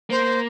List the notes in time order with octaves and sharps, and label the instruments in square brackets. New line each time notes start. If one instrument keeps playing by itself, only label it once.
[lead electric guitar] A#3 [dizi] C5